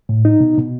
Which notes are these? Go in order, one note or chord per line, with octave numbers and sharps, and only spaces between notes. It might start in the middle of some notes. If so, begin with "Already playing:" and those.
A2
D#4
B2
B2